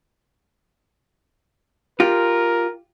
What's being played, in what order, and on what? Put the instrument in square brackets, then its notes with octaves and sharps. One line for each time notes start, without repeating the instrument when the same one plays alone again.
[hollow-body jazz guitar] F4 G4 [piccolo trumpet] A#4